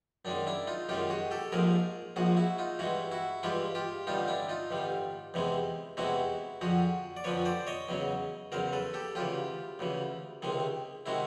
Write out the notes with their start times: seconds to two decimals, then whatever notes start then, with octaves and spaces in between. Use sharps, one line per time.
0.25 F#2 D#3 G#3 D4
0.47 D4 E4
0.67 D#4 F4
0.89 F#2 D#3 G#3 F4 G4
1.10 F#4 G#4
1.31 G4 A4
1.52 A#1 G#2 F3 G#4 A#4
2.16 A#1 G#2 F3 F#4 G#4
2.37 E4 F#4
2.58 D#4 F4
2.79 G2 E3 G#3 E4 F#4
3.11 E4 F#4
3.43 G2 E3 G#3 F4 G4
3.75 F4 G4
4.07 A1 G2 D3 G3 D#4 F4
4.28 D4 E4
4.49 D#4 F4
4.71 A1 G2 D3 G3
5.34 E2 C3 E3 G#3
5.97 E2 C3 E3 G#3 E4 F#4
6.61 F2 D3 F3 F#4 G#4
7.17 D5
7.24 F2 D3 F3 B4 C#5
7.45 C5 D5
7.67 C#5 D#5
7.89 E2 C#3 F#3
8.52 E2 C#3 F#3 A#4 C5
8.72 A4 B4
8.94 G4 A4
9.15 D2 C#3 E3 F4 G4
9.79 D2 C#3 E3
10.42 C#2 C3 D#3 G#3
11.06 C3 D#3 G#3 E4 F#4